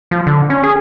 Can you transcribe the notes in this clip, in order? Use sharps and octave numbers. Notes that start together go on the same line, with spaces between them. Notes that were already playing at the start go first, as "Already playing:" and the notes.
F3
D3
C#4
G#4